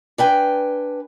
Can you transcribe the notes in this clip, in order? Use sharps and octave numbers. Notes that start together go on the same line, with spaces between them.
D4 B4 G5 G#5